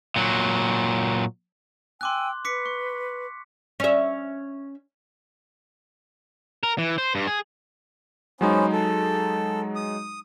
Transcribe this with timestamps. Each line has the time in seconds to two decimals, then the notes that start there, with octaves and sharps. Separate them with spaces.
0.16 A#2 F#3
2.01 G5 G#5 C6 D6 E6 F#6
2.45 B4 D6 B6 C#7
2.66 C#6
3.80 C#4 E5
6.63 A#4
6.78 E3
6.98 C5
7.15 G2
7.27 G#4
8.41 F#3 G#3 B3 C#4 D#4 C5
8.73 A4
9.76 D#6